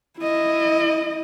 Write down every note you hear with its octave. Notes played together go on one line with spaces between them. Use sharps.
E4 D#5